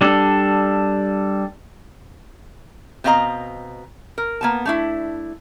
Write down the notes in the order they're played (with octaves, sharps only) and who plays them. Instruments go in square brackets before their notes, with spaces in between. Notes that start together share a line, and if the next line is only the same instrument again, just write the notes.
[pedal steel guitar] G3 D4 A4
[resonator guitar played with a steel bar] B2 C4 D#5 F5 A#5
A#4
A#3 B3 A5
A3 D4 E4